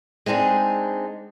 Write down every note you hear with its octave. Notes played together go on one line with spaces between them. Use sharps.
G#3 C4 D4 D#4 G#4